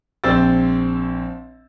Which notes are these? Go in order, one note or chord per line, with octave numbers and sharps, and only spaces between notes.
A#1 C4 C5 E6 A6